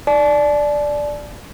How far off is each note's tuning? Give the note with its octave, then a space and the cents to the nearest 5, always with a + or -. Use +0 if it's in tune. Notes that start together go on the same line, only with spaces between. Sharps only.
D5 +0 A5 -40